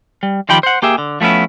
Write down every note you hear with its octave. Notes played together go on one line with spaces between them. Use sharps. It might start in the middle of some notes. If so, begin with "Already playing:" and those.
G3
D#3 F3 G4 G5 B5
C5 F#5
A#3 G4 G#4 E5
D3
F3 A3 B3 C#4 E4